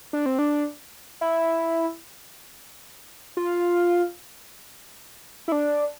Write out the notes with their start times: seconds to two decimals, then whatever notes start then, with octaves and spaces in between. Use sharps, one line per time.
0.13 D4
0.26 C4
0.39 D4
1.21 E4
3.37 F4
5.48 E4
5.52 D4